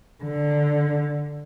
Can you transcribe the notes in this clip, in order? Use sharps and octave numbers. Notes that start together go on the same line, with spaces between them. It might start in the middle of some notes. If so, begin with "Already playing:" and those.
D3